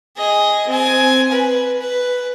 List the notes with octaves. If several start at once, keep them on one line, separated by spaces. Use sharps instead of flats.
G#4 D#5
C4 G#5
B4
B4